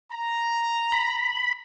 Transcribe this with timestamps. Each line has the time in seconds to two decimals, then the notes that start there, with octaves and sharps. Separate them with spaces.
0.11 A#5
0.92 B5